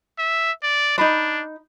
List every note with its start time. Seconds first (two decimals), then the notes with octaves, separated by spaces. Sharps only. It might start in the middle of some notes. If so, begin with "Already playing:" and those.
0.19 E5
0.63 D5
0.98 D4 D#4 B5